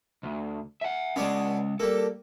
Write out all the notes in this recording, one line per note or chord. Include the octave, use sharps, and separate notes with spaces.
D2
E5 F#5
G#3 B3 C#4 D4 G#4
G3 A#3 A4